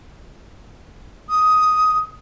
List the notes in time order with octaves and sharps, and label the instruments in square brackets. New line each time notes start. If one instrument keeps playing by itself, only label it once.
[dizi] D#6